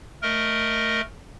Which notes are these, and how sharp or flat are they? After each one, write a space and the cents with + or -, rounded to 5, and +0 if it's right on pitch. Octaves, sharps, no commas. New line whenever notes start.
A3 +0 A#4 +0 D#5 +0